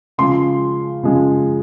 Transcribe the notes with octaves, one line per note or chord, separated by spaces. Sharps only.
C#3 F3 G#3 C6
C#3 F3 G#3